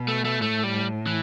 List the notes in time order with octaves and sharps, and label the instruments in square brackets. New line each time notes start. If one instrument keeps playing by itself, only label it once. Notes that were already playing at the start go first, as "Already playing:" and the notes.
Already playing: [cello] B2
[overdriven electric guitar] A3
A3
[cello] A2 [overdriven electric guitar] A3
[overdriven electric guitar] G3
E3